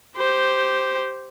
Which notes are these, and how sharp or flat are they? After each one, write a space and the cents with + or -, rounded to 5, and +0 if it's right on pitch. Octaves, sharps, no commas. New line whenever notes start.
G4 -5 C5 +0